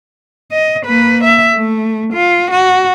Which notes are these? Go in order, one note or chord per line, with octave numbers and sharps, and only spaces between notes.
D#5
A#3 B4
E5
A3
F4
F#4